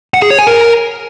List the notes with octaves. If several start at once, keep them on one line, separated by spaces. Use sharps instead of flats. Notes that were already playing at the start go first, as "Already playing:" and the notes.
F#5
G#4
C#5
G#5
A#4